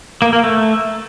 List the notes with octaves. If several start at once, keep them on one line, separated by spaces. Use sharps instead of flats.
A#3
A#3
A3